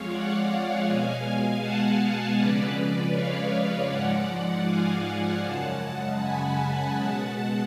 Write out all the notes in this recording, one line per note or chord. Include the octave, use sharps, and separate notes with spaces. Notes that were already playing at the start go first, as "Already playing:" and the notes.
Already playing: F2 F3 G#3 C#5 F5
D5 F#5
B2 G#3 F5 G#5
F#5 A5
F2 C#3 G#3 B4 D5
C#5 F5
G#2 F3 G#3 D5 F#5
F5 G#5
F#2 C#3 G#3 F#5 A5
G#5 B5
F#5 A5
B2 G#3